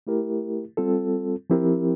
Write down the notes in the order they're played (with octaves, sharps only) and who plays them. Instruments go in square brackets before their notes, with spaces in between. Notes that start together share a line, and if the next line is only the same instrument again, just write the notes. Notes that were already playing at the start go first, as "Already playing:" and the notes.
[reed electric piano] A3 E4 G4 A#4
G3 C4 F4 A4
F3 C4 E4 G4 A#4